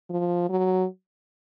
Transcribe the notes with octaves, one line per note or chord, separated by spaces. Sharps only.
F3
F#3